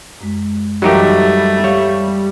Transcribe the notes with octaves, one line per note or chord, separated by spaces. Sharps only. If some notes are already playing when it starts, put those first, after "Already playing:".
F#2 G#3
F#2 E3 F#3 G3 A3 D#4 G4 A#4
G3 C#5 F5 G6